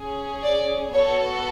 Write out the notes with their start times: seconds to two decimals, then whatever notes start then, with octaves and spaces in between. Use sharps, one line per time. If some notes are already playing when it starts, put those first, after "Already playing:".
Already playing: C#4 G#4
0.43 D5
0.94 B3 F#4 A4 C#5